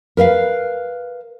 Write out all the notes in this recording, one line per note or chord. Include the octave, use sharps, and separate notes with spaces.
A#4 B4 E5 F5